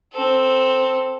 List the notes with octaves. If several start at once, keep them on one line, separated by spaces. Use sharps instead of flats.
C4 A4